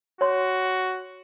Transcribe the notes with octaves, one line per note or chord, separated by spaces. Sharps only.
F#4 C#5 C6